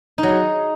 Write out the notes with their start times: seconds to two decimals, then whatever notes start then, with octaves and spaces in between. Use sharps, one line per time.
0.18 D#4
0.23 F#3
0.28 G#4